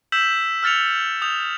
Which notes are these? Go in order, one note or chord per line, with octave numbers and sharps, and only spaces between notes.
E6 G6 B6 E7 F#7
E6 F6 A6 C#7 F7
D#6 G6 F7